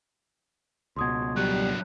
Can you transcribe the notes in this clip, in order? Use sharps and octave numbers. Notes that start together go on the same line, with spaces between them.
C#2 B2 C6 D#6 G#6
F#3 G3 D4 F#6